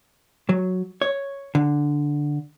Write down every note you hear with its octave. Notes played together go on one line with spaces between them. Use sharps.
F#3
C#5
D3